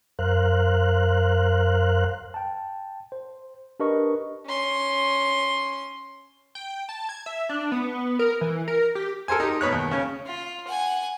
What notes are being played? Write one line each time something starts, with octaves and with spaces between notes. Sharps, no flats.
F#2 A#4 C5 F5 F#6
G5 A5
C5
D4 G4 A#4 B4 D#5 C#6
C#4 C6
G5
A5
G#6
E5
D4
B3
A#4
E3
A#4
G4
A4 A#4 C5 G#5
D#4 G4
B2 B4 C#5 F#6
D#2
C#3 C#4
F4
F#5 G#5